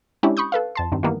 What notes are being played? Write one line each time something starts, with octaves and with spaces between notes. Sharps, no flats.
G#3 C#4 D4 E4 G4
B5 C#6 D#6 G6
A4 B4 F5
F2 A5 C6
G2 D#3 C4
D#3 E3 G3 A#3 B3